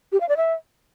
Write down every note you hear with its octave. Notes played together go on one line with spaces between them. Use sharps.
G4
F5
D5
E5